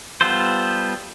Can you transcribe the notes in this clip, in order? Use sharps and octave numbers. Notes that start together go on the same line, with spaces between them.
G3 B3 F4 A4 C5